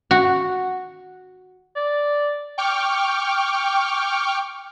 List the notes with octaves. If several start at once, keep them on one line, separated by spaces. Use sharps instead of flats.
F#4
D5
G5 C#6 D6 F6